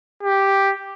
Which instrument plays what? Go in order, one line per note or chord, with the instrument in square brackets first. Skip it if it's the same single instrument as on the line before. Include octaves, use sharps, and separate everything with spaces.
[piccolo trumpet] G4